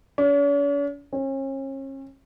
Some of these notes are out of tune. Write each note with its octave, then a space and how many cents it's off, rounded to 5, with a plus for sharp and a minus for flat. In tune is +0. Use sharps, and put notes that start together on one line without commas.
C#4 +45
C#4 -40